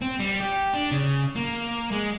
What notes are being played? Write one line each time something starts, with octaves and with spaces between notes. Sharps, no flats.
C4
G3
G4
D4
C#3
A#3
G#3